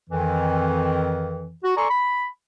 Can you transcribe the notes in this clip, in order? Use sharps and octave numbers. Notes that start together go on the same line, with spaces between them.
F2 D#3 E3
F#4
A4 D5 G#5 A#5 C6 C#6
B5